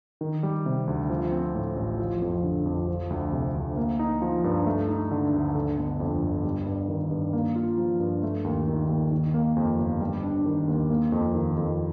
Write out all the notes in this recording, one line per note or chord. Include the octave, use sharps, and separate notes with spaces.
D#3
G3
C3
D2
F3
C4
A2
A1
F3
F2
D3
F2
F3
D2
C3
D2
A#3
D#4
F3
G2
A3
D#4
D3
D2
D3
G1
F2
G1
G3
G2
D#3
G2
A#3
F4
F3
G2
A3
D#2
D#3
D#2
D#3
A#3
F2
G1
G3
D4
D#3
D#2
A#3
F2
D#3
F2